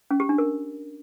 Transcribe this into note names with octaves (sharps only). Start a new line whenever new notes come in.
C#4
G4
D4
A#4